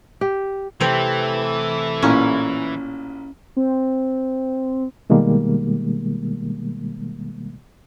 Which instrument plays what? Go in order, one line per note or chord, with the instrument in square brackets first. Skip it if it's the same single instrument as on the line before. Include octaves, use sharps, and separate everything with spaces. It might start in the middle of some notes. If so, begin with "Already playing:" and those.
[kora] G4
[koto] C3 C4 [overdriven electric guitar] E3 [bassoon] A3
[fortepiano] A1 A#2 C#6 [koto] C#4
[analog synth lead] C4
[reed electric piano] B2 D#3 G3 G#3 A#3